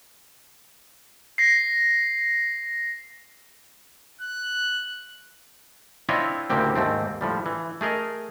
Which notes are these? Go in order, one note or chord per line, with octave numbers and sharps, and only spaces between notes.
A#6 C7
F#6
C4 D4 E4 F4 C#5 D#5
D2 A2 C#3 A#3 C4 G4
D#2 G#2 A3 C4
A2 F3 G3
E3
A3 G#4 A#4 D#5